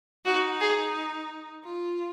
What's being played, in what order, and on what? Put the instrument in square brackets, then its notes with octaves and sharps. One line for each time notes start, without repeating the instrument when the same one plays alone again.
[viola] D#4 [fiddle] F#4
[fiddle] G#4
[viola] F4